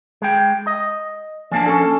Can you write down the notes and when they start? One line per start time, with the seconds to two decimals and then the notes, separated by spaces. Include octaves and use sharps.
0.22 G#3 G5
0.67 D#5
1.51 F3 A#3 D4 G#5 A5
1.66 C#4 A4